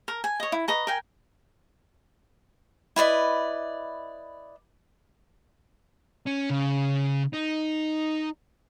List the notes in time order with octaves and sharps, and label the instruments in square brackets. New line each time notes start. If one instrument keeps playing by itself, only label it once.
[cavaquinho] A#4
G#5
C#5 D#5
E4
B4 D#5 A#5 C#6
A#4 G5 G#5
E4 B4 D5 D#5
[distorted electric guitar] C#4
C#3
D#4